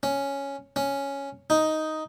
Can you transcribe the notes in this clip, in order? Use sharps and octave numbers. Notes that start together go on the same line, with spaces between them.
C#4
C#4
D#4